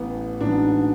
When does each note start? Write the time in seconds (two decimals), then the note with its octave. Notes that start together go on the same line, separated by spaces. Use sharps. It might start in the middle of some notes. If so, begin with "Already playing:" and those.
Already playing: A1 A2 E3 B3
0.41 A1 G#2 F#3 B3 D4